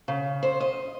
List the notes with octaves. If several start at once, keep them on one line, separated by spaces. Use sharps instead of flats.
C#3
C5
D#5